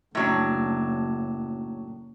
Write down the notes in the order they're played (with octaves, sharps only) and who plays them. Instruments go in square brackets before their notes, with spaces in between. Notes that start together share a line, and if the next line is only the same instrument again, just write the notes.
[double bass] F#1 [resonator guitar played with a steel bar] A2 F#3 D4